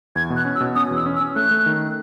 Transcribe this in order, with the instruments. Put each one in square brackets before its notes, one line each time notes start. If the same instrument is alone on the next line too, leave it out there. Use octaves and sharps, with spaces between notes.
[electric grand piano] E2 [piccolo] G#6
[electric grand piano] B2
[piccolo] F#6
[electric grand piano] C#4
[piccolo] E6
[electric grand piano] B2
[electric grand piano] C#4 [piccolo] D#6
[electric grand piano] E2
[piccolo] E6
[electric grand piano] C#4
[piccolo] E6
[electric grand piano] C#4
[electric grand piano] A3 [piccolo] F#6
[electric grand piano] A3
D#3